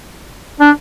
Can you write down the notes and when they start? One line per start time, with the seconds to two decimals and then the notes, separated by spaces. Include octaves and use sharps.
0.60 D4